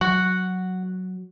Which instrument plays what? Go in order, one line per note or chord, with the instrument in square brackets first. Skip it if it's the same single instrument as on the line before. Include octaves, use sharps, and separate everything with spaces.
[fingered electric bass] F#3 [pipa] F#4 [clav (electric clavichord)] F#5